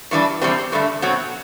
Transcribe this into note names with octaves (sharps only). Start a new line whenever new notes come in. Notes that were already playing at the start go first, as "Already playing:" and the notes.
G2 E3 G3 D4
E2 C3 G3 C4
G2 D3 A3
B2 F#3 C4